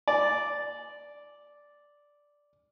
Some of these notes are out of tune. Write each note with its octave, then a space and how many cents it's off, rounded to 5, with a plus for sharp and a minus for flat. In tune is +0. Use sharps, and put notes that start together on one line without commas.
D5 -5